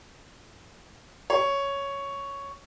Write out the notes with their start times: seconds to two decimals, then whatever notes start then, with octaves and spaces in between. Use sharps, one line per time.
1.30 C#5